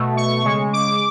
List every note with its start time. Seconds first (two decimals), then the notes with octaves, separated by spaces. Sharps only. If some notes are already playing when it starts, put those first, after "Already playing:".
Already playing: B2 A3
0.17 C#6
0.45 C#3 G#3
0.73 D6